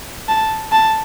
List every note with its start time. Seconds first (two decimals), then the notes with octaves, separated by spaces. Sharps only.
0.28 A5
0.72 A5